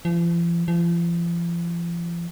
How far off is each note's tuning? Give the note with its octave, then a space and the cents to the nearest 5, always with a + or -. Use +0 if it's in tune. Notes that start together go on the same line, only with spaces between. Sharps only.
F3 -45
F3 -40